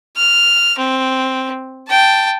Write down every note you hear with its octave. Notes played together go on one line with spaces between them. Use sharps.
F6
C4
G5 A5